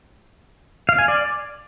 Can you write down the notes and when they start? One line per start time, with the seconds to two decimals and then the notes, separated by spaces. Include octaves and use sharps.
0.89 F5
0.98 G#5
1.08 D5